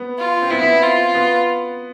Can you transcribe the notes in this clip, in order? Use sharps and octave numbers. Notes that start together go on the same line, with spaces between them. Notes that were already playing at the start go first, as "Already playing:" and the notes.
Already playing: B3
F4
C4
B3 E4
B3
C4
F4
B3